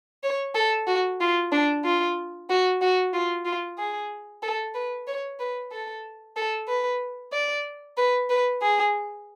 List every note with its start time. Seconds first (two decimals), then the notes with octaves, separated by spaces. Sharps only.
0.23 C#5
0.55 A4
0.87 F#4
1.21 F4
1.52 D4
1.85 F4
2.50 F#4
2.81 F#4
3.13 F4
3.45 F4
3.78 G#4
4.43 A4
4.74 B4
5.07 C#5
5.40 B4
5.72 A4
6.36 A4
6.68 B4
7.33 D5
7.97 B4
8.30 B4
8.62 G#4